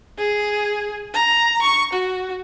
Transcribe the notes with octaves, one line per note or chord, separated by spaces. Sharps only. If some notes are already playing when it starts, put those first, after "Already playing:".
G#4
A#5
C#6
F#4